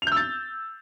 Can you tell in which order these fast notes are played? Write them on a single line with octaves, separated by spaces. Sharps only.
F7 G6 E6 A6